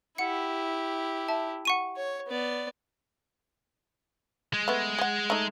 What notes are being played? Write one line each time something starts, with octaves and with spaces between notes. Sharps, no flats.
E4 G4 F#5 C#7
E5 A5
F#5 C#6 D#7
C#5
B3 D5
G#3
A3 B3
G#4 F#5
A3 D#4